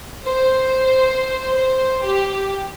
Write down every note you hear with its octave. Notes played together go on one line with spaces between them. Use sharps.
C5
C5
G4